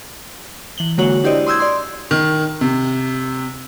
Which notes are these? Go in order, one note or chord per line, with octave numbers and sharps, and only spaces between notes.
E3 F#7 G7
D3 G#3 A#3 F#4 C#5 F#7
D4 E4 G4 C5 D5 D#5
C6 D#6 E6 G6 G#6
D5 C6
D#3
C3